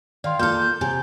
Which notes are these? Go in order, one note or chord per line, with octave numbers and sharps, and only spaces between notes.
D#3 D5 F5 C6
A#3 F4 A4 C6 F6 G6
C3 G#5